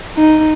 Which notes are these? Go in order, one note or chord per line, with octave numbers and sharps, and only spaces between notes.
D#4